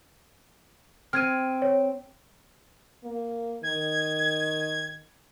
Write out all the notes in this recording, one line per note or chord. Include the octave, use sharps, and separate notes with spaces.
C4 F6 G#6 D#7
C#5
A#3
D#3 G#6